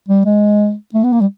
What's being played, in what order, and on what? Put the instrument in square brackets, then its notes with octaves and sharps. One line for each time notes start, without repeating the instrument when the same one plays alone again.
[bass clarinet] G3
G#3
A3
B3
A#3
G3